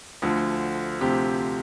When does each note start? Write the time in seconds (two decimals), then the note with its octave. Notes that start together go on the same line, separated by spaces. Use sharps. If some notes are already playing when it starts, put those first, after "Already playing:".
0.22 D2 D3 F3
1.01 D2 C3 F3 C4 G4